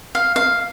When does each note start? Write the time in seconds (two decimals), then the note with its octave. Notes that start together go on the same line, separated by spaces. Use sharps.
0.15 F5
0.36 F5